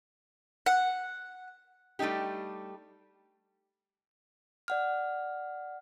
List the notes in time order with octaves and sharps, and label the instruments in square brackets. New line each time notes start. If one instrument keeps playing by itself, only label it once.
[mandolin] F#5
[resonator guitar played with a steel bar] G3 A3 D4 D#4 G4
[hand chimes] D5 F#5 F6